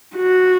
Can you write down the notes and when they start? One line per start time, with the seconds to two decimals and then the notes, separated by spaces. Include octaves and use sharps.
0.16 F#4